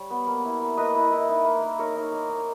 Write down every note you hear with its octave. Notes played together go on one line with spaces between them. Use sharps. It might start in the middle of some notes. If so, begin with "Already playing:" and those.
Already playing: G3 C#5
B3
A#3
E4
A#3
A#3 B4 D#5
E4
E4
D#4
A#3
A#3
D#4 A#4 C#5
D#4
A#3
D#4